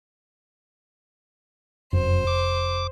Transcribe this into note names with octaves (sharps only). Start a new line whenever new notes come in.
F1 F#2 C5
D6